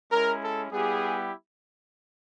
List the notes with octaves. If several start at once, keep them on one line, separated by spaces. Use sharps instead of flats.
G#3 C#4 E4 A#4
A4
G3 B3 E4 G4 G#4